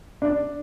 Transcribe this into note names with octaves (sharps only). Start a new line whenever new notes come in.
D4